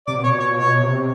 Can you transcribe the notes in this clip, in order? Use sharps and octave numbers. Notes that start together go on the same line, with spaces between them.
C3 D5
B2
A#2 C#5
B2
C#5
A#2
B2 C#5
C3